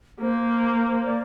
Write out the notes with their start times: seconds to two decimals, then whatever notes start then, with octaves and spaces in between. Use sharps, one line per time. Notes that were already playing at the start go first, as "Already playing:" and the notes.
0.21 A#3 C5
1.05 D5